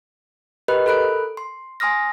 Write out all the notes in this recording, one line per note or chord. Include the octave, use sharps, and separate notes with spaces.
G4 A#4 B4 D#5 B5 F#6
A4 A#4 B5 F#6 D7
C6
G#5 C6 D#6 F6 A#6